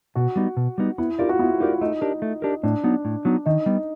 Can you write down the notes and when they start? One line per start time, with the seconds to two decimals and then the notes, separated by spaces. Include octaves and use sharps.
0.15 B2 F#4
0.36 G3 B3 D#4
0.57 B2
0.78 G3 B3 D#4
0.98 B3 E4
1.19 D#4 F4 G4 A#4 D5
1.29 F#4
1.39 B3 E4
1.60 D#4 F4 G4 A#4 D5
1.81 A3 D#4
2.01 D4 G4 A#4
2.22 A3
2.42 D4 G4 A#4
2.63 A2 D4
2.84 F#3 B3 D#4
3.05 A2
3.25 F#3 B3 D#4
3.46 D#3 D#4
3.66 G3 B3